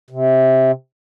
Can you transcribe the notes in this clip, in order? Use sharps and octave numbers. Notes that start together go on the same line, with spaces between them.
C3